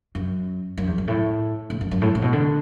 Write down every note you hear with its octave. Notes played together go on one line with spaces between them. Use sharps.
F#2
F#2
E2
F#2
A2
A2
F#2
F#2
A2
A2
B2
D3